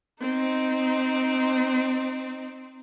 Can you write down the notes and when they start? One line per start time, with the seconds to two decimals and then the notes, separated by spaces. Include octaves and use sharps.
0.21 C4 D#4